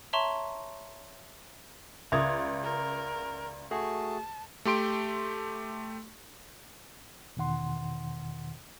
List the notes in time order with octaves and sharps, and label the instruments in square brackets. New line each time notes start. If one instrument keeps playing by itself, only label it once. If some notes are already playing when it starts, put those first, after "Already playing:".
[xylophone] C#5 E5 A5 A#5 C6 C#6
[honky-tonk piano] C#2 G#6 [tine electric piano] D5 A#5 [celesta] E5 D#6
[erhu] A#4
[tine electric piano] A3 F#4 G#4 [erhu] A5
[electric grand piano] A3 G4 C6 D7
[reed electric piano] E2 B2 D#3 F#5 C6